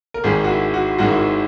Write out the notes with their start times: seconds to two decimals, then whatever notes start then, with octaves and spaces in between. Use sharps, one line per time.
0.14 A#4
0.24 G#1 G#2 D#3 G#3 G#4
0.44 F#4
0.49 E4
0.74 F#4
0.98 G#1 G#2 D#3 G#3 F#4
1.08 E4
1.17 F#4